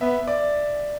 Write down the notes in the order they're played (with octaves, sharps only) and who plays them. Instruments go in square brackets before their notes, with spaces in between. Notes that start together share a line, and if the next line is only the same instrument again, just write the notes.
[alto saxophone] B3 [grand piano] E5
[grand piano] D5